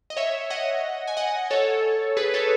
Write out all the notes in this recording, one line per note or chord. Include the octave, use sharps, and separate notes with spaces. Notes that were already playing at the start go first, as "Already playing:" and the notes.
D#5
C#5 E5
D#5 F#5
G#5
D#5 F#5
A4 C#5
G#4 B4
A4 C#5